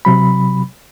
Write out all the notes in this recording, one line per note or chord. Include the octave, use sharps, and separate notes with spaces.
C3 F#3 B5